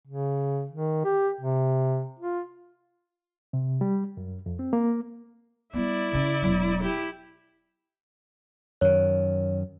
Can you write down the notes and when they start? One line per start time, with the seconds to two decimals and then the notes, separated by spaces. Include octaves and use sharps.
0.07 C#3
0.71 D#3
1.05 G4
1.41 C3
2.19 F4
3.53 C3
3.81 G3
4.17 F#2
4.46 F2
4.59 C4
4.73 A#3
5.73 G3 B3 E4 D5
6.12 C#3 C#4
6.42 E1 F#3
6.82 E4 G4
8.81 F#2 D#3 C#5